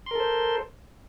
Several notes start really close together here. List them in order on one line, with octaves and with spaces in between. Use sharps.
C6 A#4 A4 C5